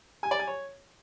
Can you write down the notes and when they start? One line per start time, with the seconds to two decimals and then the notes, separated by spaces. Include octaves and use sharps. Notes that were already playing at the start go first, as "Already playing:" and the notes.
0.23 G#5
0.31 D5
0.39 G#5
0.47 C#5